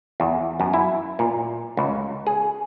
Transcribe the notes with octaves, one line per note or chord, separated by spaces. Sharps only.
E2
F#2
E4
A#2
C#2
G#4